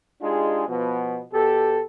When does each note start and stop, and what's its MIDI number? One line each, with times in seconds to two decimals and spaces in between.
0.21 0.66 56
0.21 0.66 62
0.21 0.66 63
0.21 0.66 65
0.21 0.66 67
0.21 0.66 68
0.68 1.24 47
0.68 1.24 53
0.68 1.24 59
1.33 1.82 47
1.33 1.82 67
1.33 1.82 69